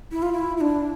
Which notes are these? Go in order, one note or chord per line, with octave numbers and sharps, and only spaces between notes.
E4
F4
E4
E4
D4